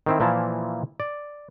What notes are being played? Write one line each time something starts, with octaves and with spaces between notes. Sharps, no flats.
D#3 C4 E4
A#2 E3 F3 A#3 E4 A5
D5